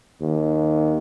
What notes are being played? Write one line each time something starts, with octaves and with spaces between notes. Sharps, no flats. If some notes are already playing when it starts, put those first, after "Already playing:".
D#2